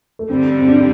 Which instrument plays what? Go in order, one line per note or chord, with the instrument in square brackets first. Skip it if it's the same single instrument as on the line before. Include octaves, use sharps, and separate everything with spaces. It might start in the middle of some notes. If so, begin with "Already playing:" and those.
[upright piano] A3
[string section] G2 D3 G3 [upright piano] C4
[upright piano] C4
D4